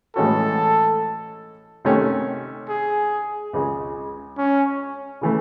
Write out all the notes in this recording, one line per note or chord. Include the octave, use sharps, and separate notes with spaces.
A2 E3 G#3 C#4 F#4 A4
C3 D#3 A3 C#4
G#4
C#2 C#3 G#3
C#4
C#3 E3 A3